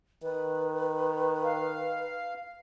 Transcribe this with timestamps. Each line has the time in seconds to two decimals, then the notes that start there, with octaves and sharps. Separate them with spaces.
0.23 D#3 B4
1.44 F5